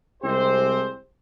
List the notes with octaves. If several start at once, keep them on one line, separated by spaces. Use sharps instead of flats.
C2 G#3 C4 G4 C5